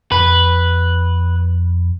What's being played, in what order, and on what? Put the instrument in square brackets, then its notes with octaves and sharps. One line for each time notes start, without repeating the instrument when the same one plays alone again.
[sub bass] F2 [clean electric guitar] B4